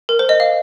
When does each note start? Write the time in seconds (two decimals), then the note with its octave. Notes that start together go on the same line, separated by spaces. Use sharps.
0.09 A#4
0.19 C5
0.29 D#5
0.40 F5